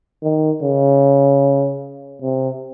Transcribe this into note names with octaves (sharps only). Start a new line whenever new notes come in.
D#3
C#3
C3